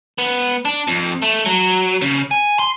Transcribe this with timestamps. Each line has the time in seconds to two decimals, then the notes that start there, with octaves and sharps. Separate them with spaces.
0.18 B3
0.65 D4
0.88 F2
1.22 A3
1.46 F#3
2.02 C#3
2.31 G#5
2.59 C6